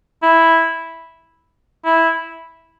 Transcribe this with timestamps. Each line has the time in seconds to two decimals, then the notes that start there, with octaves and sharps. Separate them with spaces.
0.23 E4
1.85 E4